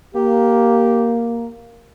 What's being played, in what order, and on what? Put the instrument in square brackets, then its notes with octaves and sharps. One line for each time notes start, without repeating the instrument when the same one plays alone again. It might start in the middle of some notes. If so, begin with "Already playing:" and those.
[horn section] A#3 [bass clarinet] G4